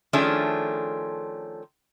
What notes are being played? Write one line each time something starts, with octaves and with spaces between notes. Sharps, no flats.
D#3 F3 A3 C#4 D4 G#4